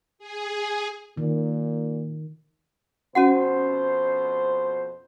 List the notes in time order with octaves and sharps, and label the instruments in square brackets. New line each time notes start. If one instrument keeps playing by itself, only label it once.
[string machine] G#4
[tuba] A#2 [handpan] D#3
[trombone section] F2 B2 C5 [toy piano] C#4 F#4 F#5